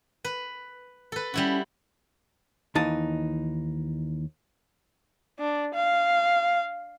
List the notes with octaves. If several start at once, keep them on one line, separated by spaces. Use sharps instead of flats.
B4
A4 B4
G3 C#4 E4 F#4
D#2 E3 D#4 A5
D4
F5